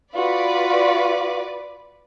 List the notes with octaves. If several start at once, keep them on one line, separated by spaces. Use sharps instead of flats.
F4 F#4 B4 D5